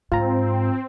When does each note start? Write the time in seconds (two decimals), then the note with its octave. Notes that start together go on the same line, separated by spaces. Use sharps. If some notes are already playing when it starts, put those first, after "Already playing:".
0.12 G#2 C4 F4 A#5